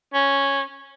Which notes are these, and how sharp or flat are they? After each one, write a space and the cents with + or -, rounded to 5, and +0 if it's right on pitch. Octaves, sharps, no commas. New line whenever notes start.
C#4 -5